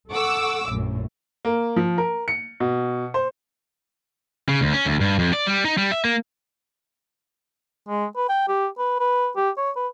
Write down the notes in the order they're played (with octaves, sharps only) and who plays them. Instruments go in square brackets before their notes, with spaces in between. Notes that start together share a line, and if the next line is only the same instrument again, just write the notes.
[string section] A4 F#5 C#6 D6 E6
A#1 F#2 A2
[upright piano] A#3
F3
A#4
C#7
B2
C5
[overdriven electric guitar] C#3
D2
C#4
D2
G2
F2
D5
G3
D#4
G3
E5
A#3
[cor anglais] G#3
B4
G5
G4
B4
B4
G4
C#5
B4